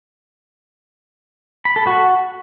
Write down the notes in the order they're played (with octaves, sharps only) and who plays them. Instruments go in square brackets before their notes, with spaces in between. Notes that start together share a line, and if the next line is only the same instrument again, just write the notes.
[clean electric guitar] B5
A4
F#4